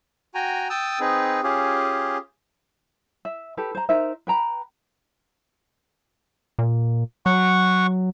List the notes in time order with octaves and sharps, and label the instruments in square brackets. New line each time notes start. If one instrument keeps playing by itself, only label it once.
[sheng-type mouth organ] F#4 G5 G#5 A#5
G5 A5 D#6 E6
C4 D#4 G#4 B4
C#4 F4 G4 G#4
[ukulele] E5
G4 A4 B4
C5 A#5
D#4 A#4 C5 E5
B4 G5 A#5 B5
[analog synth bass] A#2
[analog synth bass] F#3 [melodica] F#5 C#6